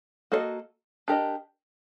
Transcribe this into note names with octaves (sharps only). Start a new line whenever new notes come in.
A#3 F#4 A4 C5 D#5
D4 G4 A#4 D#5